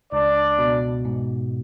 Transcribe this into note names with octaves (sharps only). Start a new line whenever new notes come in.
C#2 D4 D5
B2
G#2